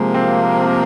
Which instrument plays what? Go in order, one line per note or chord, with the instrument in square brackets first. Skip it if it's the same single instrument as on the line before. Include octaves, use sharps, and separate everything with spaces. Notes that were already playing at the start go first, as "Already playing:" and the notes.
Already playing: [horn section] C3 F3 A#3 [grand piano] G#3
[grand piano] C4